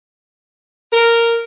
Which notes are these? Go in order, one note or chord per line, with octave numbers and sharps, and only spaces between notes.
A#4